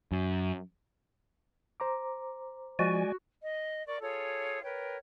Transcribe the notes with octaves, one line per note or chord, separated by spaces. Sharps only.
F#2
C5 A#5 D6
F3 G#3 F#4 D5 G#5
D#5
A#4 D5 C#6
F4 G#4 A4 C#5
A#4 B4 C#5 G5